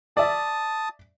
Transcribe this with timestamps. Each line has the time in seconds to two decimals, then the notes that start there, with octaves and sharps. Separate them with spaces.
0.17 D5 E5 A5 D#6